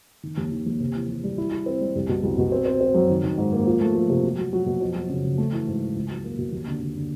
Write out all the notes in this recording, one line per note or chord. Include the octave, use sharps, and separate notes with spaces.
D#3
D#2
D#3
D#2
C3
E3
E3
G3
E4
E4
C4
G3
C2
B2
C2
B2
C4
C4
C4
F#2
D#3
D#3
G#2
A#3
F3
A3
F3
C3
F#3
F#3
F#3
B2
F2
F#3
C#3
C#3
A3
E3
G#2
E3
C#2
F#3
A#3
B2
D#2
D3
D3
D3